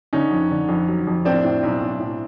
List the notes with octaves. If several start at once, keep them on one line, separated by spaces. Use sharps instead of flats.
D3 C#4 D#4
F2
D3
F2
F#3
F2
A2 C4 D4
A2
B1
B1
A2